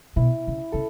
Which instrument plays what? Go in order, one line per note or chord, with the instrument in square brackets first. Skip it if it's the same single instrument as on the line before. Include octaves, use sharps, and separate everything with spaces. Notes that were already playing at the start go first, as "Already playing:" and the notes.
[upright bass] B2 [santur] E4
[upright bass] C#3
[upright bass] C#3 [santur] A4